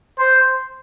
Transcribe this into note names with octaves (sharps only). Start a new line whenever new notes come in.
C5